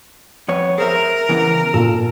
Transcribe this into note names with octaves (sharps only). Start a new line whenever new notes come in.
F2 B3 C#5
G#4 A#4 C5 E5
C#3 E3 B3
A#2 A4